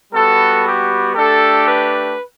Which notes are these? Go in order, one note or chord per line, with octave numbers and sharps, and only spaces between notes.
G3 B3 F#4 A4
G4
A3 D4 G4 A4
B4